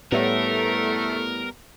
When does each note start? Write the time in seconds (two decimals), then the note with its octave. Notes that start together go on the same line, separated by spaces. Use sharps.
0.12 A2 G3 A3 B3 A#4